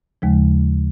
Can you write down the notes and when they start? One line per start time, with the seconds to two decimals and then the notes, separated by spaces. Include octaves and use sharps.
0.22 D#2 C#3 F3 G#3